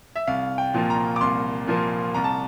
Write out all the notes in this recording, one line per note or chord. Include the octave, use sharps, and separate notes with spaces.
E5
C2 F5
G5
A#2 F3 A#3
A#5
D6
C2 C6
A#2 F3 A#3
C2 A#5
A5